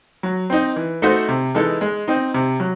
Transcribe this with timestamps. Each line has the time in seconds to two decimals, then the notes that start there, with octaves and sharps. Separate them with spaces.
0.23 F#3
0.50 C4 D#4
0.76 E3
1.02 A3 D#4 F#4 C5
1.29 C3
1.55 E3 G#3 D#4 A4
1.81 G#3
2.08 C4 D#4
2.34 C3
2.60 F#3